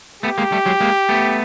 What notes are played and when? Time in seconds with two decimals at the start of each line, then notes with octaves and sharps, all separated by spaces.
0.23 A3 B3 G4
0.38 G#3 A#3
0.52 G3 A3
0.66 F#3 G#3
0.80 G#3 A#3
1.09 A3 B3